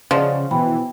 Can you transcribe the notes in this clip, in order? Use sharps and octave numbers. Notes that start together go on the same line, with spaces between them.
C#3 F3 D5 D#5 F#5
B2 E3 G5 B5